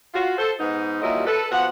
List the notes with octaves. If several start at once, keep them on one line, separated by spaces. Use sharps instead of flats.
F4 F#4
A4 C5
G#2 B3 D#4
D#2 A#2 F#3 G3 E4 D#5
A4 B4
B2 F3 C4 F#5